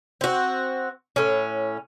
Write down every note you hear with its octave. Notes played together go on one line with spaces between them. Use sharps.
C4 F#4
A2 C#4